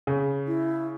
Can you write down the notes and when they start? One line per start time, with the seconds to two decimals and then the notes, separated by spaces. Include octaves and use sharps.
0.07 C#3
0.47 E4